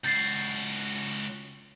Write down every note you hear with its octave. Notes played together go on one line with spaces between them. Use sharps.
C#2 F#4 G6 A6 C7